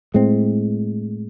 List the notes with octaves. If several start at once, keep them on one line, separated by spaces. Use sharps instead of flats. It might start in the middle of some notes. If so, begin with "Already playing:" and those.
A2 G#3 C4